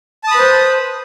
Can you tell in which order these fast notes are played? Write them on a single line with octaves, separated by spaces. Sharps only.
A5 D#6 B5 B4 C5